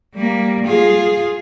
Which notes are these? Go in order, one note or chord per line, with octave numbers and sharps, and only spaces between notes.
G3 A#3
F4 G#4